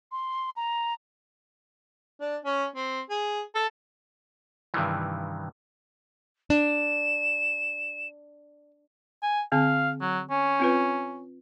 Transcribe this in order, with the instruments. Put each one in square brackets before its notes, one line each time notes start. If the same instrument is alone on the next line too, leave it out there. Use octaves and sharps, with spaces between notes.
[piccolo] C6
A#5
[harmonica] D4
C#4
C4
G#4
A4
[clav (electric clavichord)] G2 C3 D#3 E3
[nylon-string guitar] D4 [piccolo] E7
[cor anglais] G#5
[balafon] D3 C4 [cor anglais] F5
[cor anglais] F#3
C#4
[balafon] C4 F4 B4